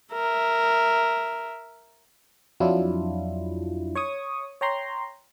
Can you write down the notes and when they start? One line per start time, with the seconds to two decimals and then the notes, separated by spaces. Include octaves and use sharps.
0.12 A#4 E5
2.60 F2 F#3 D4 E4 F4
3.95 C#5 C#6 D#6
4.61 C#5 G5 A#5 C6